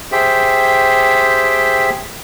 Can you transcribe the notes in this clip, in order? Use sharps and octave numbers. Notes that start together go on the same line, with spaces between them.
G4 G#4 C5 E5 G5